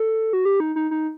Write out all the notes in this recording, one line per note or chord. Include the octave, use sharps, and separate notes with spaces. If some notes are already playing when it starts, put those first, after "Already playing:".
Already playing: A4
F#4
G4
D#4
D#4
D#4